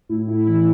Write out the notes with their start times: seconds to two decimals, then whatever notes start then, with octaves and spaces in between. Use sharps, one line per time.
0.09 A2 E4
0.28 E4
0.47 E3 E4